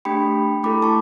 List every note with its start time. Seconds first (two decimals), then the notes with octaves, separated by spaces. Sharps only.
0.05 A3 D4 G4 G5 B5
0.63 A3 E4 A4 B5 D6
0.82 A5 C#6